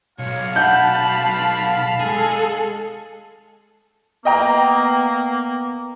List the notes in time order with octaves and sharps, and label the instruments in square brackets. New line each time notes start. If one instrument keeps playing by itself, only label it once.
[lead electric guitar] B1 [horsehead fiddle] C#5 [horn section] F5
[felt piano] F#5 G6 [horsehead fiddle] A5 B5
[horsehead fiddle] G#3 A4 [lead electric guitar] G#4
[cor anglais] A#3 [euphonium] B3 [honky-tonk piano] D#5 G5 A#5